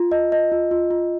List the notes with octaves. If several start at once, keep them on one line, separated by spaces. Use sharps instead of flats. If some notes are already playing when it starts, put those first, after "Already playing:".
Already playing: F4
D#5
D#5
F4
F4
F4